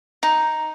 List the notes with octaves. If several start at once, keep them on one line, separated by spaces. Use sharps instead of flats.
D#4